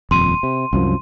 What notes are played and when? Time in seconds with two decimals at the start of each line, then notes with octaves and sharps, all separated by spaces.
0.11 D#1 F2 C6 D#7
0.43 C3
0.73 C2 F#2 F3